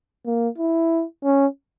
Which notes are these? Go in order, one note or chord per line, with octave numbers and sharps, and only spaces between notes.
A#3
E4
C#4